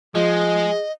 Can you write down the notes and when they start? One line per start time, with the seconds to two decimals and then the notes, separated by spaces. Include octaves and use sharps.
0.15 F3 G#3 G#4 D#5